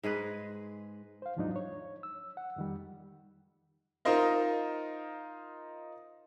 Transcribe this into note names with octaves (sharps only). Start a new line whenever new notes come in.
G#2 G#3 G#4 B4
C5 F5
D#2 G#2 F3 F#3 D4 D#4
C#5
E6
F#5
F2 D#3 G3
D#4 F4 A#4 C5 D#5 F5